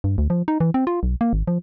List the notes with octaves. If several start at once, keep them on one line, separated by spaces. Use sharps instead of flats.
G2
D2
F3
D#4
E3
C4
F4
B1
A#3
G#1
F3